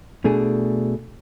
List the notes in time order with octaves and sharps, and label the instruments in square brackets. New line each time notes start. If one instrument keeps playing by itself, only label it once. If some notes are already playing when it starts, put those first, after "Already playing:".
[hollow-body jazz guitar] B2 A3 D4 G#4